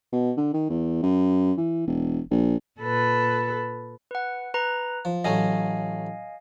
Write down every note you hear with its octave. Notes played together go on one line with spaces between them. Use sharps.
B2
D3
D#3
E2
F#2
E3
E1
A#1
A#2 A4 B4
B4 F#5
B4 A#5
F3
A1 F#3 A3 D#5 F5 G#5